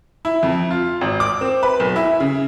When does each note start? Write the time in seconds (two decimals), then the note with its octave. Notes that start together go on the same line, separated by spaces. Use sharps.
0.25 E4
0.43 F2
0.71 F4
1.01 G#1
1.20 D6
1.41 C4
1.63 B4
1.80 B1
1.96 E4
2.20 C#3